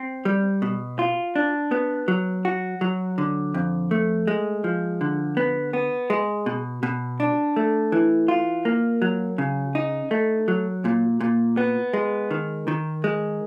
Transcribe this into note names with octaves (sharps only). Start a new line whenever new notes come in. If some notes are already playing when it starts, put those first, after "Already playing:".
Already playing: C4
G3
B2
F4
D4
B3
F#3
F#4
F#3
D3
F2
A3
G#3
F3
D3
B3
B3
G#3
B2
B2
D4
A3
E3
F4
A#3
F#3
C#3
D#4
A3
F#3
A#2
A#2
B3
G#3
D#3
D#3
G#3